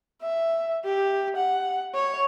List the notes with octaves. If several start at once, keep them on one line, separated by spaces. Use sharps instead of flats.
E5
G4
F#5
C#5